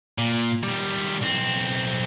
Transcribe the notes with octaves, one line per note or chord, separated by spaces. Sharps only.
A#2
D#3 G3
B1 C4